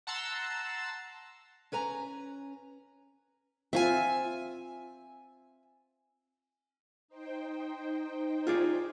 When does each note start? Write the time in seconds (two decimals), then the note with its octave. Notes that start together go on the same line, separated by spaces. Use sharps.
0.07 F#5 A5 A#5 C6 E6
1.72 C#4 B4 G#5 A#5
3.73 C4 F4 E5 G#5
7.08 D#4 C5 G5
8.47 F4 G#4 D5